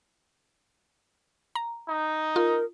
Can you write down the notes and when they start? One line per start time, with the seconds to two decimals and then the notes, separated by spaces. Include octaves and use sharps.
1.55 A#5
1.88 D#4
2.36 F4 A#4